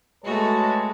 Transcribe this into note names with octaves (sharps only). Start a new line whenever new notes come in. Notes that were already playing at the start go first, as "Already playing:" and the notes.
G#3 A3 F#4 B4 C#5 A5